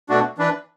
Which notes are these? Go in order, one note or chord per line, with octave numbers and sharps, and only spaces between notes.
B2 A3 D4 F#4
E3 D4 B4